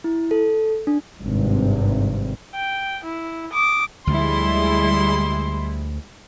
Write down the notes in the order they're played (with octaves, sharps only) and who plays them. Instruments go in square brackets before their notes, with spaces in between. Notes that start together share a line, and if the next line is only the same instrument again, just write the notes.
[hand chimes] E4
A4
D4
[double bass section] G#1 G2 C3
[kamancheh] G5
E4
D6 D#6
[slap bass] D2 D3 F3 [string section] G3 G#3 E4 [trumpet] C6